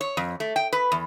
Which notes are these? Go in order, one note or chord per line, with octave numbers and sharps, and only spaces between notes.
C#5
F2
A3
G5
B4
E2